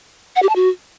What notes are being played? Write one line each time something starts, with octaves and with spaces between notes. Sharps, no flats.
F#5
G4
A5
F#4